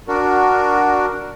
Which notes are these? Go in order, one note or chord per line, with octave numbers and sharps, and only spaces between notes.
D4 F#4 A#4